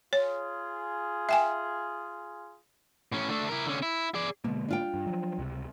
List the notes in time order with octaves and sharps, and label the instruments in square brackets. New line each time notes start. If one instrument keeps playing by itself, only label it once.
[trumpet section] F4 G#4 [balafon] C#5
[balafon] E5 G5 G#5
[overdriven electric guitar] A2 C#4
A3 D4
E4 A#4
D3 C#4
E4
G#4 D5
[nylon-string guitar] B2 [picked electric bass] D3 G#3 A#3
[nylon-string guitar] D4 F4 G5
[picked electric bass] G2
F3 F#3
C#2 C3